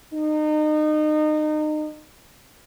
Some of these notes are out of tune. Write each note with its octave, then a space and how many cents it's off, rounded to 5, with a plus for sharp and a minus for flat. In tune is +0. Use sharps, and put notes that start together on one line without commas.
D#4 -30